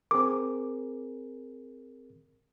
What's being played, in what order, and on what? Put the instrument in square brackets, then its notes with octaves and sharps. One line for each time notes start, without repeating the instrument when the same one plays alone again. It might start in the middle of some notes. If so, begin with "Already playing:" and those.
[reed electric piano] C4 G#4 A#4 [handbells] D6